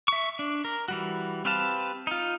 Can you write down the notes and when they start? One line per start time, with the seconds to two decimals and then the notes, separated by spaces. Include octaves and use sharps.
0.08 E5 C#6
0.39 D4
0.65 A#4
0.88 E3 G3 F#4
1.45 C4 G4 B4 F5 A5
2.07 D#4 F4